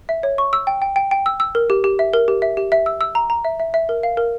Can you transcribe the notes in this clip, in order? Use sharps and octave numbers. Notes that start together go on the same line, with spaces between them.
E5
C#5
C#6
E6
G5
G5
G5
G5
E6
E6
A#4
G4
G4
E5
A#4
G4
E5
G4
E5
E6
E6
A#5
A#5
E5
E5
E5
A#4
F5
A#4